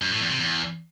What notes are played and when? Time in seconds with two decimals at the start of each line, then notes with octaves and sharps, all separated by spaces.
0.02 F#2
0.11 A2
0.21 E2
0.30 C3
0.39 E2